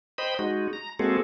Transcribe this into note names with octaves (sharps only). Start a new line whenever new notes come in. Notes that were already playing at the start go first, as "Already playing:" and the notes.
C5 D#5 G5 B5
G#3 D#4 F#4
A#5
G#3 A#3 C4 F#4 G#4 A4